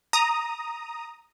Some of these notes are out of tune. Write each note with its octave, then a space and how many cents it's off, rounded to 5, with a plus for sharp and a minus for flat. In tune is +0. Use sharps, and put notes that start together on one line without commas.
A#5 +0 D#6 +0